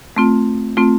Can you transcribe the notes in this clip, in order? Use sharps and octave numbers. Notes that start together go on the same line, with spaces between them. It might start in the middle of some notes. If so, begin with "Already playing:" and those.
A3 C4 F4
A3 C4 F4